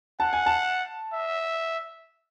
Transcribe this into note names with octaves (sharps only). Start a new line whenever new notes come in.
F#5 A5
G#5
A5
E5